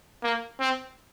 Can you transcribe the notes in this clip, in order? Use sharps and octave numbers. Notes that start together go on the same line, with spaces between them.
A#3
C4